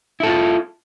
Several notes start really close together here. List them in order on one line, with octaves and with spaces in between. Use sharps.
E4 A4 F4